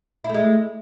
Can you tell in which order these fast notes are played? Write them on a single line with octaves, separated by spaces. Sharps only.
E4 A3 G#3